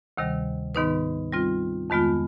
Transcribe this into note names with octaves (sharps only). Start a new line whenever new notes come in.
D2 C3 D#3 G3
G#2 D#3 B3 D#4 B4
G3 C4 F4
F2 D#3 G#3 B3 F4